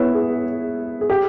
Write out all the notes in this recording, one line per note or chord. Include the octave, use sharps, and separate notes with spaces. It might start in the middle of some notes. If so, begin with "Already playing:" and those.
Already playing: B3 E4 B4 C#5 E5
G#4
G#4
G4